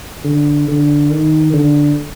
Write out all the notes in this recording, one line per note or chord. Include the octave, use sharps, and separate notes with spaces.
D3
D3
D#3
D3